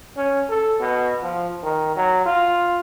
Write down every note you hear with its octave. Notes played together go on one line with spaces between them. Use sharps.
C#4
A4
B2
F3
D#3
F#3
F4